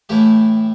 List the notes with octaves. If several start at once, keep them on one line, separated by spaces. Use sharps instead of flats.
A2 E3 A3 G4